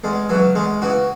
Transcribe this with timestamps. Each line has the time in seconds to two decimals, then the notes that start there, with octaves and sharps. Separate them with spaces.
0.04 E2 G#3
0.29 C#3 E3 F#3
0.55 E2 G#3
0.82 C#3 E3 F#4